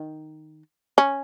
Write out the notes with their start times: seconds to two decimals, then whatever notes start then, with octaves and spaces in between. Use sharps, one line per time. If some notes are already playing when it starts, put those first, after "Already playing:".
Already playing: D#3
0.98 C#4